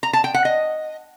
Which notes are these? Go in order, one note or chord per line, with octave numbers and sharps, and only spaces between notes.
A#5
A5
G5
F#5
D#5